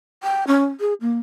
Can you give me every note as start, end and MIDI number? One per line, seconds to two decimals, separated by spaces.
0.23 0.44 79
0.47 0.67 61
0.80 0.94 68
1.01 1.18 58